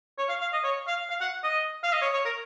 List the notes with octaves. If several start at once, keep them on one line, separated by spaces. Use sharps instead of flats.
C#5
F5
F5
D#5
C#5
F5
F5
F#5
D#5
F5
D#5
C#5
C#5
A#4